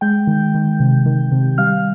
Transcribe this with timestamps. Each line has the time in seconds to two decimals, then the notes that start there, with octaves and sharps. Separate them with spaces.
0.01 G#3 G5 G6
0.27 D#3
0.55 D#3
0.80 C3
1.06 D#3
1.32 C3
1.58 G3 F5 F6